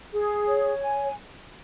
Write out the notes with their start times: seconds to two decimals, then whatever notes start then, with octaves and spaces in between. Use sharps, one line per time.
0.13 G#4
0.47 C#5
0.81 G#5